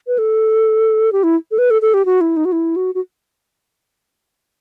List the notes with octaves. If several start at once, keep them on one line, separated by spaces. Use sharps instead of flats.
B4
A4
G4
E4
A4
B4
A4
A4
G4
F#4
E4
D#4
F#4
E4
F#4
F#4